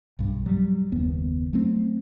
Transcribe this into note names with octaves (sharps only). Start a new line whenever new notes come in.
B1 G2
F#3 G3
F#1 D#2 B3
F#3 A3 C4